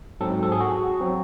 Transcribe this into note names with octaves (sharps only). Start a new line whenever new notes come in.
G#2 F#3 C4 A4
A4
G#4
F#4
F#3 C4